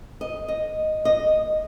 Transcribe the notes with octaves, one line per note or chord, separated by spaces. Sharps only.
D#5
D#5
D#5